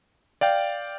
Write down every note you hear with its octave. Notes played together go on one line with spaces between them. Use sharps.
D5 F5 G5